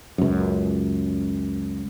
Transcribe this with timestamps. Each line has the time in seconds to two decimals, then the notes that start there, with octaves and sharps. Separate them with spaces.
0.18 C#2 F#2